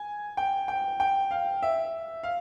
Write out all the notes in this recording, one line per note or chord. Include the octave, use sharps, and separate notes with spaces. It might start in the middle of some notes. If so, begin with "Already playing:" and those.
Already playing: G#5
G5
G5
G5
F5
E5
F5